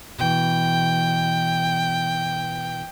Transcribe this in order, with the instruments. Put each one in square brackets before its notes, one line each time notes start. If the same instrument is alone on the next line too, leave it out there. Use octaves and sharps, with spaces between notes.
[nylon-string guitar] B2 E3 [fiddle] G5